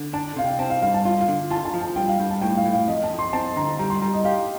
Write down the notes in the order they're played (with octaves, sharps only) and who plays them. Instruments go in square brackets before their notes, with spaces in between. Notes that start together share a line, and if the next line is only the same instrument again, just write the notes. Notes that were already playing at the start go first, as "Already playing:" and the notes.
Already playing: [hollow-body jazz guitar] D3
[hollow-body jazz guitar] D4 [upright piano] A5
[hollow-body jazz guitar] C3 [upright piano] F5
[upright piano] G5
[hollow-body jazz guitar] C4 [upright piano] A5
[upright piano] F5
[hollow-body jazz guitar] G2 [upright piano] F5
[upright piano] A5
[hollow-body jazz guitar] F4 [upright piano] F5
[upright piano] F5
[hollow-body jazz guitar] D3
[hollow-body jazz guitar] F4 [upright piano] A5
[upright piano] A5
[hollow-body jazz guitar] F3
[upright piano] A5
[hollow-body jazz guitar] G2 [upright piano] G5
[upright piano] F5
[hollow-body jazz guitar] G2 [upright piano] G5
[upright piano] A5
[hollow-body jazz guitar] A2 [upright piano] G5
[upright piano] F5
[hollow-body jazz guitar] A2
[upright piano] F5
[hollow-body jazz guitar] F2 [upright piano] D#5
[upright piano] A5
[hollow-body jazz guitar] F2
[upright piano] C6
[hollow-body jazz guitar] C4 [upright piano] A5
[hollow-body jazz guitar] D3 [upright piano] A#5
[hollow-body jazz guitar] G3 [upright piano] A#5
[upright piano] C6
[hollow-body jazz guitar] G3 [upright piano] A#5
[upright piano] D#5
[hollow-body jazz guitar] G4 [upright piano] F5